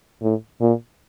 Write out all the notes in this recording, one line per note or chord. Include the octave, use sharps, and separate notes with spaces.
A2
A#2